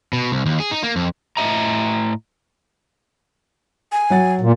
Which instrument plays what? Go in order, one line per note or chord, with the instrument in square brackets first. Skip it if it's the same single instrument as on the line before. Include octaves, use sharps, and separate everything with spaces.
[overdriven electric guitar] B2
C2
D#2
G#4
D#4
A#3
F2
[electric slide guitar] A2 F4 D#5 E5 A#5
[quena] G#5
[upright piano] F#3 F#5 A6
[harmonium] A#2